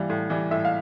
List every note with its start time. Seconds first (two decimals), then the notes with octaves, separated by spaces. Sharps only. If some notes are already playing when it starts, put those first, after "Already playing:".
Already playing: E3 G3 F5
0.10 A2
0.30 E3 G3
0.51 A2 E5
0.65 F5